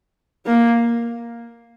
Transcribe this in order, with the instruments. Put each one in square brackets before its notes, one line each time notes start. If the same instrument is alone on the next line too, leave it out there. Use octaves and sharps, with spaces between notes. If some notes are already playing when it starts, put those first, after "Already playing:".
[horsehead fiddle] A#3